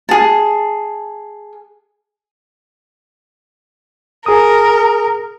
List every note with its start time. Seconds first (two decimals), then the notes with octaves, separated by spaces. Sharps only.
0.09 G#4 A5
4.26 G#4 A#4 D#6